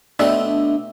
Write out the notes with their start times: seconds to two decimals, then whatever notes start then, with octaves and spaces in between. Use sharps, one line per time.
0.19 B2 A3 C4 D4 E5